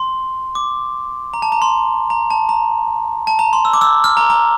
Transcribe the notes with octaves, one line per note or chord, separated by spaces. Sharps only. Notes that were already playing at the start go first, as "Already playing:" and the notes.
Already playing: C6
D6
A#5
A5
A#5
C6
A#5
A5
A#5
A5
A#5
C6
E6
D6
E6
F6
A#5
A#5